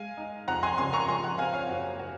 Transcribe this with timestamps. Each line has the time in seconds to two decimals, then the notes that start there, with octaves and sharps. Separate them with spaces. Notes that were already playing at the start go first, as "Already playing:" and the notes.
Already playing: G#3 F5 G#5
0.17 D#4
0.48 F2 F#5 A#5
0.63 G#5 C6
0.78 C#3 G#5 C6
0.93 A#5 C#6
1.08 F3 G#5 C6
1.23 F#5 A#5
1.38 C4 F5 G#5
1.54 C#5 F5
1.69 F#1 F#4
1.99 F#4